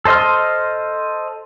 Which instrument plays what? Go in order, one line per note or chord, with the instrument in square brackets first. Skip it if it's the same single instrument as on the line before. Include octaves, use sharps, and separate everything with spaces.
[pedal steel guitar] A4 C5 D#5 C6 F6